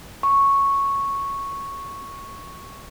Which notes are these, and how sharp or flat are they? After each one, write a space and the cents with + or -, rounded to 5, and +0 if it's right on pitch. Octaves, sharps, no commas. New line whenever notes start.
C#6 -5